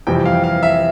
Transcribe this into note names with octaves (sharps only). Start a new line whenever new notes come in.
F2 C3 E3 G3 G5
F5
F5
E5